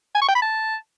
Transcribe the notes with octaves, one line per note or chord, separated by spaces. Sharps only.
G#5
C#6
G5
B5
A5